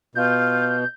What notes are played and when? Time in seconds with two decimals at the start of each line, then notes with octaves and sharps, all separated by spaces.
0.15 B2 F4 G6